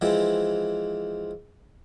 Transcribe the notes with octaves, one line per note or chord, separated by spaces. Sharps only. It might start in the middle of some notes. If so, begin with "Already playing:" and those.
E3 F3 G#3 C4